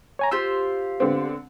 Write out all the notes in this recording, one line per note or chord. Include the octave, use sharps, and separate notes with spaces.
C#5 G#5 A#5
F4 G4 C5 E6
D3 B3 C4